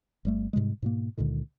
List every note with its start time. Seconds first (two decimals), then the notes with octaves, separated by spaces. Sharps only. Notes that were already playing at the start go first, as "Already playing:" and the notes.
0.25 G1 G3 A3
0.53 G#2 C3 G3 G#3
0.82 G#2 B2 A#3
1.18 C#2 A#2 D3 D#3